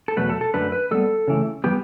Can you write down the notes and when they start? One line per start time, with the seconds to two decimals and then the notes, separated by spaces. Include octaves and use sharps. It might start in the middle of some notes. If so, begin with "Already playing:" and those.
0.08 A4
0.17 E2 B2 F#3 A3 B4
0.29 A4
0.41 A4
0.54 F#2 D3 A3 B4
0.72 B4
0.91 A2 G3 B3 A4
1.28 C#3 E3 A3
1.64 E3 G3 B3 G4